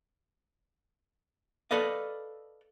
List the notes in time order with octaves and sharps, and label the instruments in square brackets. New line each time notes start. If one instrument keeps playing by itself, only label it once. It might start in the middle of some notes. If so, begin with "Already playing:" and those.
[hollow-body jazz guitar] A4 B4 D5 D#5 F5